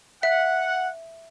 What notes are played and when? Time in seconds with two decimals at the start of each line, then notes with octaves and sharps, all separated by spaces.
0.23 E5 F#5